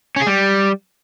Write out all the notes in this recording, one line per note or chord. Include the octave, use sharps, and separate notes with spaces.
C#4
G#4
G3